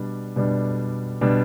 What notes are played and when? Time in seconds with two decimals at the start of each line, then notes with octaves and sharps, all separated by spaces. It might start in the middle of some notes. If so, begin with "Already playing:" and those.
Already playing: B2 G3 D4
0.36 B2 G3 D4
1.21 B2 G3 D4